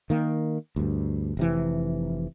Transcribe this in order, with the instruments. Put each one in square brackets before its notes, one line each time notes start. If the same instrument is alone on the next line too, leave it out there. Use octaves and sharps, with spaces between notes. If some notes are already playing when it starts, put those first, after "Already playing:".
[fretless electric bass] D#3 A#3
D2 G2
F1 C3 E3